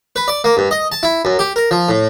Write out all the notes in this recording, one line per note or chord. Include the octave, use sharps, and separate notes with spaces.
B4
D5
A#3
G2
D#5
A5
E4
F#2
G4
A#4
F3
A2